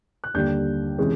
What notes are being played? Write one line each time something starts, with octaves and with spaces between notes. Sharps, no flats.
F#6
D#2 D3 G3 G6
C3 E3 G#3 C#4